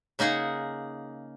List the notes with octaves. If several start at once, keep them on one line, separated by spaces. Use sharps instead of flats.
C#3 A#3 D#4 G#4 F#5